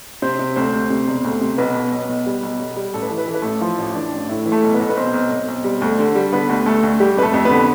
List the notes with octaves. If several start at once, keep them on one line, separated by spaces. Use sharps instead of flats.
C3 C4 C5
C3
D2 C4 C5
D2
C3
E1
D2
C3
B1 B3 B4
B2
B1
B1
G3
B1
B1
G3
A1 A4
B4
E3 A4
B4
E3 A4
B4
A1 A3 A4
E3 F3 F4
A1
E3 D4
A1
A2 E4
E3
A3 A4
B1
B3 B4
B1 A4
B4
B1 C4 C5
B1
B1
B1
G3
D2
D3
G3
D3 B3 B4
D2
D2 A3 A4
D2
G3 G4
F2 B4
A3 A4
F2
B3 B4
D3